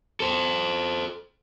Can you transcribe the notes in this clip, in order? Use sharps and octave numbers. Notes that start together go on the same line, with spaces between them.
A4 C5